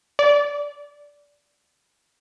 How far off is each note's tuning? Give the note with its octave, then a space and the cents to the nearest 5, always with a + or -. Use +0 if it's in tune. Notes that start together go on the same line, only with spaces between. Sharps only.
D5 -15